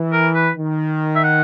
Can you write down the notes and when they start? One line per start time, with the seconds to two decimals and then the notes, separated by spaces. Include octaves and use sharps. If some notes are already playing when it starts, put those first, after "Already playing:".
Already playing: E3
0.13 A#4
0.35 B4
0.57 D#3
1.16 E5
1.24 F#5